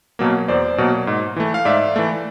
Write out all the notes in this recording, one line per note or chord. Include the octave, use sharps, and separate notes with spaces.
B2 F#3 A#3
E2 C5 D5
B2 F#3 A#3
G#2
E3 A3
F5
G#2 D5 E5
E3 A3